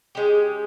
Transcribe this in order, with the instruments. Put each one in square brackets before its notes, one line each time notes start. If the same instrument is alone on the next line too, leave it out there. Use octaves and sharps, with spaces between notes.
[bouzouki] G#3 C#4 G4